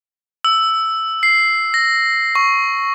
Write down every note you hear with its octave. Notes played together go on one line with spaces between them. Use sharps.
E6
C7
A#6
C#6